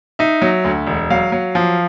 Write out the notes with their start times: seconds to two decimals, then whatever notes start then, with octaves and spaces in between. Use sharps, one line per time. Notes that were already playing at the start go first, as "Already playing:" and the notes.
0.19 D#4 E5
0.42 F#3
0.64 D2
0.87 E1
1.10 F#3 F5
1.32 F#3
1.55 F3